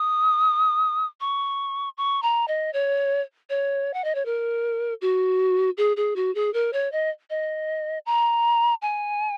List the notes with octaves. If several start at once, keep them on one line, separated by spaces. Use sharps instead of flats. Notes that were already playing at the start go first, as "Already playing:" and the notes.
Already playing: D#6
C#6
C#6
A#5
D#5
C#5
C#5
F#5
D#5
C#5
A#4
F#4
G#4
G#4
F#4
G#4
A#4
C#5
D#5
D#5
A#5
G#5